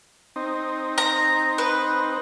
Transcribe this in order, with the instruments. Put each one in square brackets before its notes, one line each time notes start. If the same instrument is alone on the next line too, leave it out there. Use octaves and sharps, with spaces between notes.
[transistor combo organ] C4 D#4
[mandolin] A#5
B4